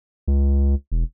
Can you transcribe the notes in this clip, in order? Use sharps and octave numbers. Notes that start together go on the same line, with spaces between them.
C#2
E1